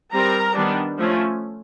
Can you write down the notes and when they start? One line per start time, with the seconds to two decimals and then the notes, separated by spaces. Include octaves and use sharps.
0.14 G3 C4 A#4 A#5
0.56 D#3 G3 B3 D4
0.98 F3 A3 C#4